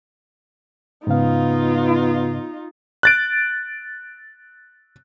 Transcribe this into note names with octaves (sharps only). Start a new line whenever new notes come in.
G#2 C#3 B3 D#4 F4 F5
F#6 A6 D7